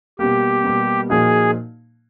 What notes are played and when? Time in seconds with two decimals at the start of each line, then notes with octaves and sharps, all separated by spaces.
0.19 B2 G3 A#3 G4
0.64 B2 G3 A#3
1.09 A#2 F3 A#3 D#4 F#4 G#4